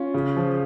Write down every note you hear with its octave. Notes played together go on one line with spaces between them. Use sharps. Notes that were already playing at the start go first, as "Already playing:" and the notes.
Already playing: C#4 F4
C#3
F3